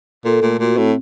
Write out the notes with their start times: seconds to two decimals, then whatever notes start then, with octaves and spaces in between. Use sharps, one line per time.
0.25 A#2 A4
0.42 A#2 A3
0.59 A#2 F#4
0.77 A2 C4